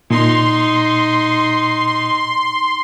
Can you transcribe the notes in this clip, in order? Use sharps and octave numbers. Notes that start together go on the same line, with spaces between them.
A#2 D#4 C6